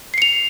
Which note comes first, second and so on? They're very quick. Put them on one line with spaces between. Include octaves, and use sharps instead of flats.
C7 C#7 F7